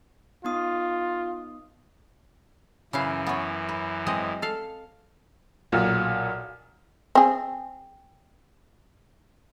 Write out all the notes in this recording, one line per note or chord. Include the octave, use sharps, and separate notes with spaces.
B3 D#4 F4 D#6
F#2 C#3 E3 E4 F5
B3 C#5
B4
G#3 C4 D#5
A4 F5
B1 A#2
C4 G#4